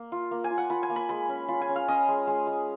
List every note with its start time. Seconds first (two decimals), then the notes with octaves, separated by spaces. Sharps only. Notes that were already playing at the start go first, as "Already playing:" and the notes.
Already playing: A#3
0.12 F4
0.31 A#3
0.44 G#5
0.50 F4
0.58 F#5
0.70 F4 B5
0.83 G#5
0.89 A#3
0.96 B5
1.09 G#3 B5
1.29 C#4
1.48 F4 B5
1.61 G#5
1.69 C#4
1.76 F5
1.88 C#4 D#5
2.08 G#3
2.27 G#3
2.47 G#3